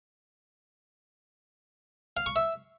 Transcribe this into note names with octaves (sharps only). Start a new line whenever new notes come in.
F5
C#6
E5